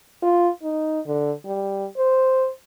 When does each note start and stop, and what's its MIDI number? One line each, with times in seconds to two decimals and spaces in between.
0.22 0.49 65
0.63 1.00 63
1.06 1.32 50
1.46 1.85 55
1.97 2.49 72